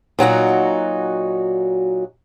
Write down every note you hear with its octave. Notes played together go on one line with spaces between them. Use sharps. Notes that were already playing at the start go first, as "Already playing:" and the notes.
A#2 F#3 D#4 F#4